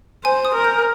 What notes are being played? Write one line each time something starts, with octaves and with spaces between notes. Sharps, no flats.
C5 G#5
D#6
A#4
G6